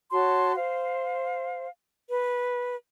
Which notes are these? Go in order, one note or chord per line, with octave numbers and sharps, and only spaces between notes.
F#4 C#5 A5 C6
C5 F5
B4